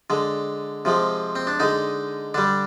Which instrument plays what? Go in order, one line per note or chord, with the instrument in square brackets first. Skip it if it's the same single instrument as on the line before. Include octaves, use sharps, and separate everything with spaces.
[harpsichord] D3 G#3
C3 F3 G#3
C4
D4
D3 G#3 D#4
D3 G3 D4